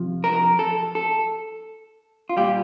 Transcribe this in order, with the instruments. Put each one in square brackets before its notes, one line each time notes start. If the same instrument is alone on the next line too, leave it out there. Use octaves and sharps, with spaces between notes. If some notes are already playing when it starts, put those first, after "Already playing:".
Already playing: [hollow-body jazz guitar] F2 C3 F3
A#4
A4
A4
F4
A#2 G3 G4